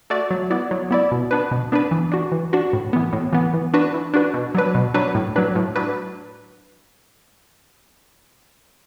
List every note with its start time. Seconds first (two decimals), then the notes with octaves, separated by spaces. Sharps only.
0.10 A3 F#4 D5
0.31 F#3
0.50 B3 E4 D5
0.71 F#3
0.91 B3 E4 D5
1.12 B2
1.31 B3 D4 B4
1.51 B2
1.72 B3 D4 B4
1.91 E3
2.12 D4 F#4
2.32 E3
2.53 D4 F#4
2.73 A2
2.93 E3 B3
3.13 A2
3.33 E3 B3
3.54 E3
3.74 D4 F#4 B4
3.94 E3
4.14 D4 F#4 B4
4.34 B2
4.55 F#3 D4 B4
4.75 B2
4.94 F#3 D4 B4
5.15 A2
5.36 F#3 D4 B4
5.55 A2
5.76 F#3 D4 B4